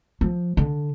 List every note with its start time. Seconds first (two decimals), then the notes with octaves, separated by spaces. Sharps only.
0.21 F3
0.57 D3